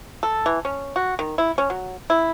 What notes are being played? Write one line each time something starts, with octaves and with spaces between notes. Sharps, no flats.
A4
E3
C#4
F#4
D#3
E4
C#4
F#3
E4